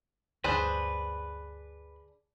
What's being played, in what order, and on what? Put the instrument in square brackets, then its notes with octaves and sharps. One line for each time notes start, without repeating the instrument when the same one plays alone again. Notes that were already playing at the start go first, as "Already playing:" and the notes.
[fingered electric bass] D2 G2 [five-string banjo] D4 G#4 C5 [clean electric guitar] B4